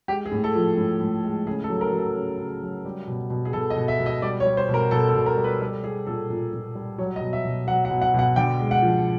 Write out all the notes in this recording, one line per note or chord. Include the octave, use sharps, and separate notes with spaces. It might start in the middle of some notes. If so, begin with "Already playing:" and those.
G#3 G4
G#4
A2
A4
F3
A2
A2
G#3
C#3 G#4
A4
F#3
A#4
F#3
A4
C#3
C#3
F#3
G3
B2
B2
G#4
B2 A4
D#5
B2
E5
B2
D#5
G3 D5
C#5
G3
C5
B2
A#4
B2 A4
A4
B2
A#4
G3
B4
G3 A4
G3 G#4
A#2 A4
A#2
A#2
G3
F#3 C#5
D#5
B2
E5
B2
F#3 F#5
F#5
B2
F#5
B2 F#5
D3 G5
G#3
F#5
F3